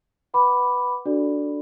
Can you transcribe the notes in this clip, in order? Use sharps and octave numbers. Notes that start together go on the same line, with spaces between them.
B4 F#5 B5 D6
D4 F#4 A4 D5